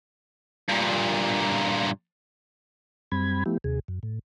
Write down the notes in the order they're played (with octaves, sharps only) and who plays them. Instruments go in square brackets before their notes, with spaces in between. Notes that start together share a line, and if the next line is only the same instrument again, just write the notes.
[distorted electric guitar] G2 A#2
[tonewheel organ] F#2 G3 C4 B5 G#6
F3 A3 B3 E4 G4
D#2 C3 G#4
F#2
A2